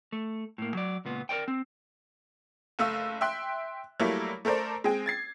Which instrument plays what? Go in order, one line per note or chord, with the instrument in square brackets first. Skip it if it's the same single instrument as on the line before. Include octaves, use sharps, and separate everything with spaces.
[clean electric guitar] A3
A2 A#3
F#3 D5
C#2 A#2 B3
A#4 C#5 D5 G5
C4
[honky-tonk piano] F#1 A3 F5 E6
E5 G5 C6 F#6
F#3 G3 A3 A#3 E4
A3 A4 A#4 C5 D5
G#3 C4 G#4 G5
G#6 A6 C7